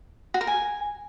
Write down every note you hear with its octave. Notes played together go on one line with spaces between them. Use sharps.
F#4
A#4
G#5